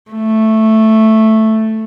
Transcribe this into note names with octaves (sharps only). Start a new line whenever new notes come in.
A3